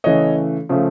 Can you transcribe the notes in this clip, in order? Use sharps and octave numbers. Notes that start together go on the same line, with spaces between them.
C#3 E3 A3 C#5 D#5
C#3 F3 A3